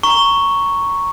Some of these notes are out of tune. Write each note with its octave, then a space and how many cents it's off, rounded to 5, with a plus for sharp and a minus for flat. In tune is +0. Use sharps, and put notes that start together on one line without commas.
A#5 +0 C#6 +0